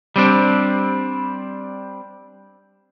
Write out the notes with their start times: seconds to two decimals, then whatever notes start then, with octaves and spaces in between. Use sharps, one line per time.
0.16 G3 C4 D4